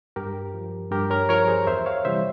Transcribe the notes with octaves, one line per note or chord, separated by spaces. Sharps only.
G2 G4 A#4
F3
G2 G4 A#4
A#4 C#5
F3 A#4 C#5
G#4 C5
E2 C5 E5
C#5 F5
C3 E3 G3 C5 E5